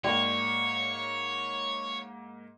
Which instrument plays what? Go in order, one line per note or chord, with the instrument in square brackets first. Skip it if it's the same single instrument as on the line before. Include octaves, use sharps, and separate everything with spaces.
[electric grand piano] G#2 A#3 [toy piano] F#4 D5 G5 [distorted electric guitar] C#5